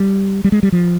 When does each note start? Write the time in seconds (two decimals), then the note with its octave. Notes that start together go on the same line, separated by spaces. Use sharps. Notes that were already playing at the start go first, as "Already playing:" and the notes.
Already playing: G3
0.44 G3
0.52 G#3
0.63 G3
0.72 F3